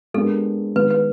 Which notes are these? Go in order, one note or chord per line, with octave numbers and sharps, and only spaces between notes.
G#3 B3 D4 G4 A4 A#4
D#3 G#3 B3 B4
B4